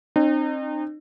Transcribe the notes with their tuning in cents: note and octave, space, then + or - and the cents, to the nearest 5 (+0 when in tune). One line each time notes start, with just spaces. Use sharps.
C4 +30 D#4 -35